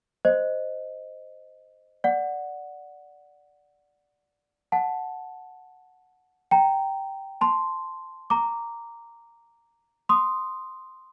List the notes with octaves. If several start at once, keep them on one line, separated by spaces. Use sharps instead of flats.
C5 D#5
D5 F#5
F#5 A5
G5 A#5
A5 C6
A#5 D6
C6 D#6